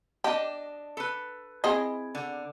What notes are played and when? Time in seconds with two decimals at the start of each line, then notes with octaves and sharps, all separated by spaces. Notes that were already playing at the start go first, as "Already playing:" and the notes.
0.24 D4 G4 D#5 A5
0.97 A4 B4
1.64 C4 E4 G#4 D#5
2.15 D3